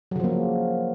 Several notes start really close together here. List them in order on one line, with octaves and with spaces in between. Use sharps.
F#3 C#3 F3 A#3